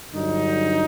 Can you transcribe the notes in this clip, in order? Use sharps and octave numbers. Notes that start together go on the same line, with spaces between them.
G2 D3 F#3 D#4